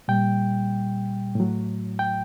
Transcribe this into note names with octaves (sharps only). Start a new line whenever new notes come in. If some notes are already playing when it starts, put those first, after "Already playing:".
A#2 G3 G5
A2 F#3
G5